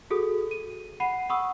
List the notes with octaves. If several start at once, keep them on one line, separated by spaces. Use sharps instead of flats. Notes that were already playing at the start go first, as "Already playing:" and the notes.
F#4 G#4 A4 D#6
D#7
F#5 B5 C7 D#7
F#5 B5 C#6 D#6 E6